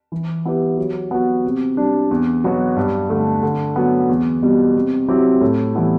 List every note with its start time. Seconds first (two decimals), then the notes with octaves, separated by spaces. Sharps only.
0.12 E3
0.45 B3 E4 G4 B4
0.77 F#3
1.11 B3 F#4
1.45 C3
1.77 G3 D4
2.11 E2
2.44 B2 F#3 B3 F#4
2.76 G2
3.10 D3 A3
3.43 D3
3.76 F#3 B3
4.09 E2
4.42 B2 G3
4.76 C3
5.08 F#3 C4 E4 G4
5.41 A2
5.75 E3 G3 B3 E4